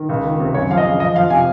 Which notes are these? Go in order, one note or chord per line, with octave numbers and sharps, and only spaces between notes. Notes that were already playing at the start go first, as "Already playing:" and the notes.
Already playing: D#3
C#2
D#3
C3
F#2 C#5
F3 F5
D#5
C#3
F2 D#5
F3 F5
C3 G#5